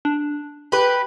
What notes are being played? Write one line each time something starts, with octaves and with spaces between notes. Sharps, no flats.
D4
G4 B4 B5